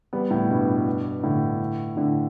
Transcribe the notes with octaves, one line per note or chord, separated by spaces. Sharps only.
G3 B3
A2
G2 B2
A2 D3
A2 D3